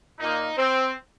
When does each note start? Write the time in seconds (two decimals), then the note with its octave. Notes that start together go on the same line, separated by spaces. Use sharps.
0.19 A#2 A#3 D#4
0.58 C4